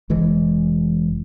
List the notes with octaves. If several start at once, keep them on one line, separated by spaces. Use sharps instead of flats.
F1 E3 G#3